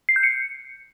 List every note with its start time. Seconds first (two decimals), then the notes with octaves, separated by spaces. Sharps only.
0.09 C7
0.16 G6
0.23 C#7